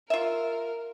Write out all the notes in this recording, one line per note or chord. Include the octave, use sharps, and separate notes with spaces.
F4 A#4 E5